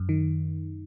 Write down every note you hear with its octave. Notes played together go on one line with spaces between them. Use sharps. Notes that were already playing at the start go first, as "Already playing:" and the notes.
Already playing: F#2
D#3